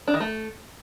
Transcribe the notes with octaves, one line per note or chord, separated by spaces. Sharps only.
D4
D#3
A3